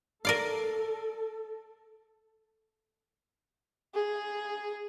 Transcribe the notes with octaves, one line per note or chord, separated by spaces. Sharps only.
A4 A#4 D5 F5
G#4